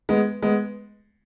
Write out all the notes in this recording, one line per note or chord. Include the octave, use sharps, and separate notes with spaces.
G#3 B3
G#3 B3